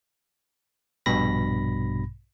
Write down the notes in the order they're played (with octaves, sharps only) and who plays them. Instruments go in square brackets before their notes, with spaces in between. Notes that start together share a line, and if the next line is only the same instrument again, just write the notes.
[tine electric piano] A#1 G2 B2 B5 A#6